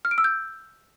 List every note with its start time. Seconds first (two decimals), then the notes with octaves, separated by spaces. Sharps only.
0.05 F6
0.11 D7
0.18 E6
0.24 G6